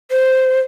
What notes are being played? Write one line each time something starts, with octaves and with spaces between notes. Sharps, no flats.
C5